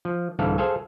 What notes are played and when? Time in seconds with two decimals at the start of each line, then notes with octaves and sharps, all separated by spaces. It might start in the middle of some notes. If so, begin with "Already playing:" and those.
0.05 F3
0.39 C2 G#2 D3 E3 A4 F5
0.58 G#4 A4 C5 F5 G#5